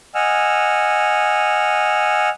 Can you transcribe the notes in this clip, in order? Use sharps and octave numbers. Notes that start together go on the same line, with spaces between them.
D#5 F#5 G#5 E6 F6